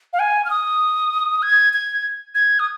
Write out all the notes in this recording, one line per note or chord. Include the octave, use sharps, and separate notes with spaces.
F5
G#5
F6
D#6
G#6
G#6
G#6
D#6